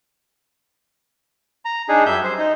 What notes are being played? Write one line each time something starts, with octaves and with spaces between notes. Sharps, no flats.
A#5
D4 D#4 G#4
F#2 G3 E5 G6
C5
D#4